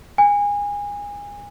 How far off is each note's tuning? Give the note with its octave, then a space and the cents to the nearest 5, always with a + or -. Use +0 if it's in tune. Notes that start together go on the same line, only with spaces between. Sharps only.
G#5 -25